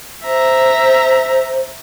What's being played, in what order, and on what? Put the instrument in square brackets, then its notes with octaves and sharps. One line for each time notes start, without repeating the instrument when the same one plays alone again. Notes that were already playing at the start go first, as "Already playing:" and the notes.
[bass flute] C5 [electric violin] E5 A#5